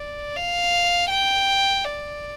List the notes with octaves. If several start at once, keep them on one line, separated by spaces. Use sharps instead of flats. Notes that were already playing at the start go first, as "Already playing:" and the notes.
Already playing: D5
F5
G5
D5